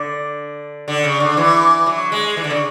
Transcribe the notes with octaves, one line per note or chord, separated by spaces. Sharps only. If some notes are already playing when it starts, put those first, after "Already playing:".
Already playing: D3
D3
C#3
D3
E3
F#3
G#3
E3
D3
C#3